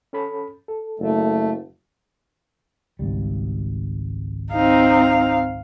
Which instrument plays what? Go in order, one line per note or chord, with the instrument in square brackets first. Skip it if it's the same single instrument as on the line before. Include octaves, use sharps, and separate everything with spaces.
[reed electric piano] C#4 A4 B5
A4
[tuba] F#1 [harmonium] A3
[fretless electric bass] G#1 C#2 G3
[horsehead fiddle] C4 D#4 [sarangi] F5